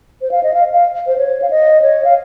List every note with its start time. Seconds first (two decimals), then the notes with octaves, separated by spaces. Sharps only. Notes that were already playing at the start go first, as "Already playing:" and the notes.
0.22 C5
0.31 F5
0.43 D#5
0.54 F5
0.74 F5
1.07 C5
1.18 C#5
1.42 F5
1.50 D#5
1.82 C#5
2.04 F5